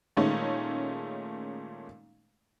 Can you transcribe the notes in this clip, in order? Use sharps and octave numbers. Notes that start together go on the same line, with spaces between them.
A#2 D#3 G#3 A3 C#4 D#4